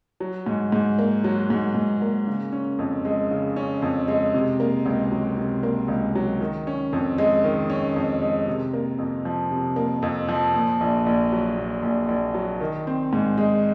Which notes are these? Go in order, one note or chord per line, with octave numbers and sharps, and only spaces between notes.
F#3
G#2
G#2
A#3
F#3
G#2
G#2
A#3
C#3
C#4
F2
G#3
C#3
C#4
F2
G#3
C3
A#3
C#2
F#3
C3
A#3
C#2
F#3
D#3
C#4
F2
G#3
D#3
C#4
F2
G#3
C3
A#3
F2
F3
C3
A#3
F2
F3
A#2
A#1
A#1
F#3
A#2
A#1
A#1
F#3
D#3
C4
G#2
G#3